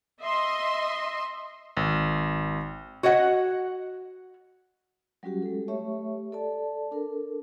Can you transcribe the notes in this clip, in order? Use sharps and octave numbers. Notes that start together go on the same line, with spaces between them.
D#5 E5 C6
G#1
F#4 C#5 D#5 F#5
F#3 G3 C#4 F#4 G4
G#3 A4
A3 G4 C#5 E5 C#6
A4 D5 A5
D4 A4 A#4